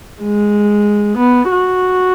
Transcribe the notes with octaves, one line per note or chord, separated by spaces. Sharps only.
G#3
B3
F#4